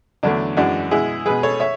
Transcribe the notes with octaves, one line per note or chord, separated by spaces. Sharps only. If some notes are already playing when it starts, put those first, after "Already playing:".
E2 D3 F#3 A3 D4
F#2 E3 G#3 D4 F#4
B2 G#3 E4 G#4
B2 G#3 G#4 B4
A4 C#5
C#5 E5